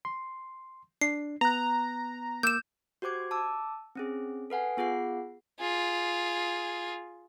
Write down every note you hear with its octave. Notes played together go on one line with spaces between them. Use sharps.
C6
D4 C7
B3 A#5 F#6
A#3 D6 E6 G6 E7
F#4 G4 C5 D6 G#6
A5 D6 E6
C4 C#4 G#4
A4 B4 F#5 G#5
B3 F4 G#4 F#5 C7
F4 G#4